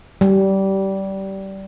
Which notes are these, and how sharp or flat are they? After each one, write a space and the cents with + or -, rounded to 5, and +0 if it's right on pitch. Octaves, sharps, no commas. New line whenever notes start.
G3 -20